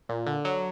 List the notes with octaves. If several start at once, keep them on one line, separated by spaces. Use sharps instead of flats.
A#2
D3
F#3